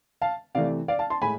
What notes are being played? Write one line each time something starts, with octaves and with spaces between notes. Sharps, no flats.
F5 A5
C3 E3 A3 D5 F5
D5 F5
F5 A5
A5 C6
A2 G#3 G#5 B5